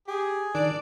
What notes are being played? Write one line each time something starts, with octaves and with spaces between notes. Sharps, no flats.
G4 G#4
D#3 D4 D5